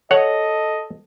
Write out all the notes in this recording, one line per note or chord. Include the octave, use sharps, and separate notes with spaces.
A4 C#5 D#5 F#5